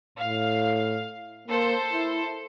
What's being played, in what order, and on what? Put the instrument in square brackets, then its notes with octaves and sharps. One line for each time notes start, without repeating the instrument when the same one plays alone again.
[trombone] A2 [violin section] F5
[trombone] A#3 [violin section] A4 C5
[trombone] E4